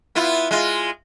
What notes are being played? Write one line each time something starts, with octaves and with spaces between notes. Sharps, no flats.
B3 E4 F4
G#3 F4